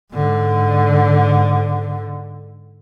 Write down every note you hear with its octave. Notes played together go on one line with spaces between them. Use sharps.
G#2 D3